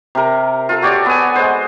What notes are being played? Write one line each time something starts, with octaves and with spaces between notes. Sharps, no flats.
C3 A#4
F4 A4
F#4 G4 C#5 D5
B3 G#5
G#3 C5